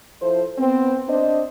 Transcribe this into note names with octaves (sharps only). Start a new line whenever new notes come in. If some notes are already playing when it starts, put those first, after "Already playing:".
F3 E4 A4 C5
B3 C4
D4 C5 D#5